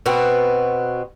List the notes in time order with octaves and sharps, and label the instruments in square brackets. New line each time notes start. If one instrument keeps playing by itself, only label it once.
[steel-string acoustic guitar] B2 B3 C4 F#4